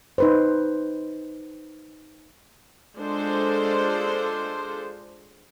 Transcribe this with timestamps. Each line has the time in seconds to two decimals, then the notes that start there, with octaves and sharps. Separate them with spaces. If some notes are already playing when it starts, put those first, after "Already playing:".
0.18 D#4 B4 C5
2.98 G#3 D4 F4 A4 C5